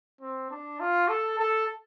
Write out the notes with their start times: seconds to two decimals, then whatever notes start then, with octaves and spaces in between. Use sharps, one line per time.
0.21 C4
0.51 D4
0.80 F4
1.09 A4
1.39 A4